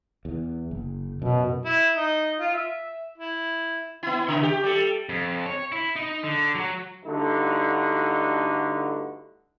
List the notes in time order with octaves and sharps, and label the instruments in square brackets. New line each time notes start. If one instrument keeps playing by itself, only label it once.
[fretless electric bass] E2
F#1
[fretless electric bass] F#2 [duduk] B2
[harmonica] E4
D#4
F4
E5
E4
[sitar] B3 E4
C#3
G4
G3 A4
[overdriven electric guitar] F2
C#5
E4
D#4
D3
F#3
[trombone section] G2 D3 A3 D#4 E4 F#4